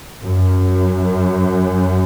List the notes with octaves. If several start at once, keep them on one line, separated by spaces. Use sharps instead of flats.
F#2